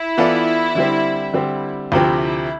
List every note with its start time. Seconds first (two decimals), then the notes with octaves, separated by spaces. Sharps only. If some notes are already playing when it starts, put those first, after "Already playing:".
Already playing: E4
0.18 E3 B3 F4 A4 D5
0.75 D3 G3 C4
1.34 D3 G3 C4
1.92 D2 C3 F3 C4 E4 G4
2.21 E4